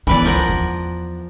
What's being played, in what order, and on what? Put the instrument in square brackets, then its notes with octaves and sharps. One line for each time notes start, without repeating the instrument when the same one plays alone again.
[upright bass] D#3 B3 [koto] E3 B4 D5
[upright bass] C#2 [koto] F3 A#4 F#5
[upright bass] E2